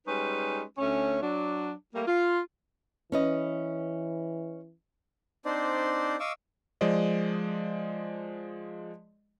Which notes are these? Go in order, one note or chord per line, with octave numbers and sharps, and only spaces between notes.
G3 G#3 C#4 D#4 B4
D2 A3 C#4
F#3 D4
G3 A3 A#3
F4
E3 C#4 B4 D#5
C4 D4 D#4 C5 D5
D#5 F5 C#6 D6 E6
F3 G#3 C5 D5 D#5